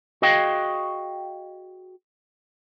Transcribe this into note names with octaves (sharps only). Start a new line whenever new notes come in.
F#4 G#4 D#5 F5 G5